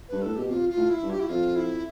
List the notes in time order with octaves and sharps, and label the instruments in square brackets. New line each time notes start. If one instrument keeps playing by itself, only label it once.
[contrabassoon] G2 [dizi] B4
[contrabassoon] A2 [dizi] A4
[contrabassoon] B2 [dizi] G4
[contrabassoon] C3 [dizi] F4
[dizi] F4
[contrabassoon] A2
[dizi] E4
[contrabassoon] G2
[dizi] G4
E4
[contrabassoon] F2 [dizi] F4
[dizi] E4